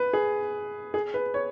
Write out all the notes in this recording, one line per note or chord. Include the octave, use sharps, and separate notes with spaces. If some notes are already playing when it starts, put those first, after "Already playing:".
Already playing: B4
G#4
G#4
B4
C#5